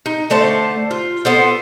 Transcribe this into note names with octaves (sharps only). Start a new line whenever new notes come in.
D#4
D3 A3 C5 A5
F4
B3 A4 C5